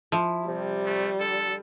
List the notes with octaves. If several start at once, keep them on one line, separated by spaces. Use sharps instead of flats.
F3 E4
C3 G3
A3
D3 A4